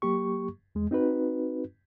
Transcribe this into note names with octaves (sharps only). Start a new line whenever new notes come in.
F#3 A#3 G4 C#6
E2 G#3
C4 D#4 F#4 B4